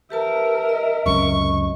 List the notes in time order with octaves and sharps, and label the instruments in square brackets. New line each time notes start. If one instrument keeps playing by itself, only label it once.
[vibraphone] G4 B4 A5 [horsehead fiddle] A#4 E5
[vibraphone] D#5
[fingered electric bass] C#2 F#2 C3 [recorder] C#6